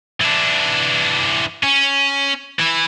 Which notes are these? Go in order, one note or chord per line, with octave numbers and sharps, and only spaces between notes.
E3 D4
C#4
E3 E4